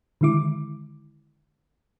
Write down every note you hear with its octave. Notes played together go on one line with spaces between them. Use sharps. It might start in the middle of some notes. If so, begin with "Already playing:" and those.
D3 D#3 G#3 E4 D6